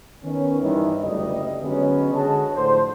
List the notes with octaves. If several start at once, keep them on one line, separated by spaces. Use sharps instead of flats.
D#3 B3 C#4
G2 D#3 E3
F#1 D2 G3 A3 D#5
D3 F#3 G#3 B3 C#4
D3 G#3 F#4 G#4 D#5 A5
A2 D3 F3 C5